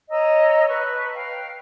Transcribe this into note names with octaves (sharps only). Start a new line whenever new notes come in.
C#5 D#5 A#5 E6
B4 A5 C#6
F5 G5